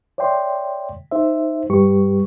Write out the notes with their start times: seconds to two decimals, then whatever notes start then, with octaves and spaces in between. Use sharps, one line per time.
0.18 C#5 D5 E5 G5 C6
1.12 D#4 C5 E5
1.70 G2 G3 G4 B4 C#6